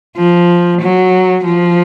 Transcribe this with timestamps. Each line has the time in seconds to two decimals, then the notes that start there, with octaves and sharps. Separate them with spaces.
0.17 F3
0.82 F#3
1.45 F3